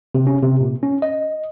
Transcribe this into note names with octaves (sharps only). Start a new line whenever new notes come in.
C3
C#4
C3
A#2
C#4
D#5